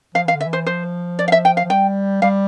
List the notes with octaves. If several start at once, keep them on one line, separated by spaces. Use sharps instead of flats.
F3 F5
E3 F5
D3
E5
E3
C5
F3 C5
D5
F5
E5
G5
F5
F3
G3 G5
G3 F5